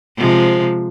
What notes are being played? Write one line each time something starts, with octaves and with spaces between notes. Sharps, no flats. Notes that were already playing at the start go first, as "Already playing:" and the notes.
C3 F3 G#3